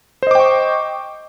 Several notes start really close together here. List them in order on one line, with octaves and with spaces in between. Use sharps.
C5 D#5 D6 G5 C#6